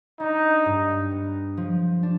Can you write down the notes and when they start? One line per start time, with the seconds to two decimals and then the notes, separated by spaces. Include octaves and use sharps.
0.19 D4 D#4
0.66 G2
1.11 B3
1.57 F3
2.03 D4